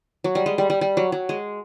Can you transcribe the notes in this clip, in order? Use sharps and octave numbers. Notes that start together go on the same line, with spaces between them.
F#3
G3
G#3
G3
G3
G3
F#3
F#3
G#3